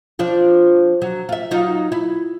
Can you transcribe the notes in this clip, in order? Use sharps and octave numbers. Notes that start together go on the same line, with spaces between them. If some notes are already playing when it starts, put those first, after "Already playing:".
F3 D4 F4
F#3
F4 E5
F#3 D#4 F4
E4